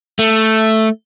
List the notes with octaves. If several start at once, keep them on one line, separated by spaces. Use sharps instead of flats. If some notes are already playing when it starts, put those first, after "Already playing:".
A3